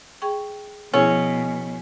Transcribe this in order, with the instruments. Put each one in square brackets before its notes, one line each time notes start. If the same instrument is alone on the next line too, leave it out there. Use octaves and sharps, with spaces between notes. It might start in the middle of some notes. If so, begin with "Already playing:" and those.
[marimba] G#4 G5 C#6
[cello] B2 [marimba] F3 E4 G#4 [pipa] C#4